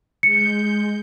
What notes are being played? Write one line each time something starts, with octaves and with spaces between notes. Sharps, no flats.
G#3 G6 C#7